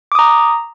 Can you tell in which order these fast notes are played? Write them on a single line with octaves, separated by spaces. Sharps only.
D6 D#6 A#5